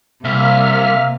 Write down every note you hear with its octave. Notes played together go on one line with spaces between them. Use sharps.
C2 C3 A#3 E5 F6